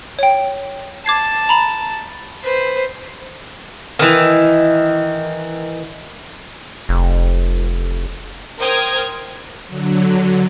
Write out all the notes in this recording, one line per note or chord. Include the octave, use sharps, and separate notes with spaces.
C#5 G5
A5 D6 G#6 C7
A#5 B5 F7
B4 C5
D#3 E3
F1
A#4 C5 G5 D#6 F6 G#6
D3 F#3